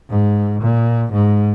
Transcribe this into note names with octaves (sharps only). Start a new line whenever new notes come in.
G#2
A#2
G#2